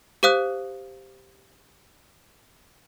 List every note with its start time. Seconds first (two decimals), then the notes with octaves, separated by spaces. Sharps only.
0.23 G4 C5 F5 D#6 F#6